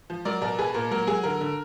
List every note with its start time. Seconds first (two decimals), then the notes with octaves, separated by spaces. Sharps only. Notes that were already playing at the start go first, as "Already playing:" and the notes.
0.10 F3
0.25 F#3 A#4 D5
0.41 B2 A#4 D5
0.59 B2 G#4 B4
0.74 A#2 A#4
0.91 F#3 A#4
1.07 F#3 G#4
1.23 D3 A#4
1.41 D3